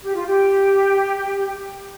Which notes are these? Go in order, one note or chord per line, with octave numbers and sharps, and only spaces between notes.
G4
F4
G4